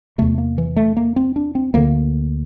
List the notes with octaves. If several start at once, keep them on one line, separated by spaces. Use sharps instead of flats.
E2 C3 A3
A#3
E3
A3
A#3
C4
D4
C4
D2 D3 A#3